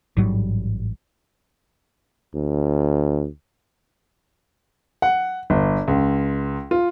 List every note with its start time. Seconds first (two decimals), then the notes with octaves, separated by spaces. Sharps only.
0.17 A1 G#2 F#3 G3
2.35 D2
5.02 F#5
5.50 G1
5.88 C#2
6.71 F4